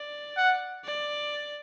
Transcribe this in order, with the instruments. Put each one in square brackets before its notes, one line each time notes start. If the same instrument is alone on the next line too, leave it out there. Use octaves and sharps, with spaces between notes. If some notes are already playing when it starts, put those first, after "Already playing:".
Already playing: [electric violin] D5
[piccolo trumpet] F#5
[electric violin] D5